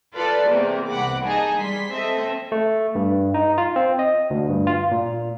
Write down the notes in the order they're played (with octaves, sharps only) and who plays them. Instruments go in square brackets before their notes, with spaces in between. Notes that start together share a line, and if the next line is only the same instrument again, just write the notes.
[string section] F4 A4 B4 D5
E2 C3 A#3
C2 F#5 B5 D6
D#4 G#4 D#5 A5
G3 C6 B6
C4 A4 D#5 E5
[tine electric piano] A3
G2
D#4
F4
C4
D#5
D2
G2
F4
A#2